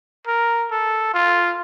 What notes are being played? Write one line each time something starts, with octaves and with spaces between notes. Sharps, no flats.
A#4
A4
F4